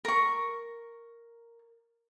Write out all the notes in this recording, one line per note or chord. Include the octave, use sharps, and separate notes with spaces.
A#4 C#6